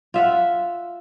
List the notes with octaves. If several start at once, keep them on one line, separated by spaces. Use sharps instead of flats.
F4 E5 F#5